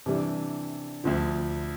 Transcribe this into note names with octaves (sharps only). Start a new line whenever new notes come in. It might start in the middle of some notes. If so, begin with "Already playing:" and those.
C3 E3 G3 D4
D2 D3 F3